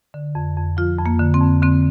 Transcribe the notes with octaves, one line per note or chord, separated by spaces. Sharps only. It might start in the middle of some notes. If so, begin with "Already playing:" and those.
D3
F2
F2
F3 F4
F2
A#3
D3
C4
F2
D3 C4